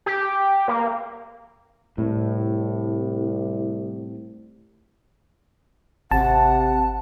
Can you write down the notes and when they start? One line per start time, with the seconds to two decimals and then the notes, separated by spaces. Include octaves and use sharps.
0.06 G4
0.68 A#3
1.98 C2 A2
6.11 G#1 C3 F#5 A5